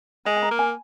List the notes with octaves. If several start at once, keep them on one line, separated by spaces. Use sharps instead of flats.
G#3 G#5
G#5
A#5
A#3
G#5